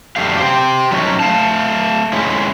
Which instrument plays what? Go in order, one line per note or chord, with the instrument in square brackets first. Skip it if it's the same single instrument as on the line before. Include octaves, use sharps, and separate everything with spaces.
[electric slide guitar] F#2 D3 A3 G4 F5
G4 C5 G5
F#3 A3 C#4 D#4 C#5
A3 F5 A5
G#3 C#4 E4